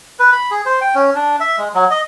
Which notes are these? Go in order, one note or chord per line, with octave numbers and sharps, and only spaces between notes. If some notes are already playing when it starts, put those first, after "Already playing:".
B4
B5
G#4
C5
G5
C#4
D4
E5
G#3
F#3
D#5